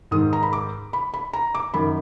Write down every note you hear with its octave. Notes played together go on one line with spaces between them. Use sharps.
G#2 D#3 D#6
A#5
B5
D6
B5
B5
A#5
D6
F#2 D#3 B5